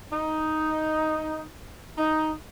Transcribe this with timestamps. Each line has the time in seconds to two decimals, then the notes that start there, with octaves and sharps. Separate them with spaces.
0.12 D#4
1.98 D#4